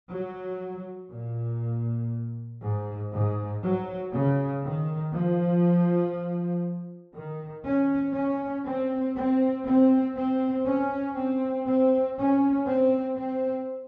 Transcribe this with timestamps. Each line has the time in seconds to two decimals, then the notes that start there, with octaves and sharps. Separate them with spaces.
0.10 F#3
1.11 A#2
2.61 G#2
3.12 G#2
3.63 F#3
4.12 C#3
4.63 D#3
5.14 F3
7.14 D#3
7.65 C#4
8.15 C#4
8.66 C4
9.15 C4
9.66 C4
10.16 C4
10.66 C#4
11.16 C4
11.67 C4
12.18 C#4
12.67 C4
13.17 C4